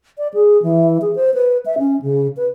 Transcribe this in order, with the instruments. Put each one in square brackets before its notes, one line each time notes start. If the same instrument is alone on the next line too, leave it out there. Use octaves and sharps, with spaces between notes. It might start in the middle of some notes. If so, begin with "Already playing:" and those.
[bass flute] D5
G#4
E3
G#4
C5
B4
E5
C#4
C#3
B4